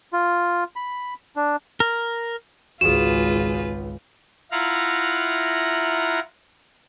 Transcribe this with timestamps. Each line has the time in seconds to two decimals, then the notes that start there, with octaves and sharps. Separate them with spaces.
0.13 F4
0.76 B5
1.36 D4
1.80 A#4
2.81 G#1 C#2 F4 F#4 G#4 B4 E7
4.51 E4 F4 F5 F#5 A#5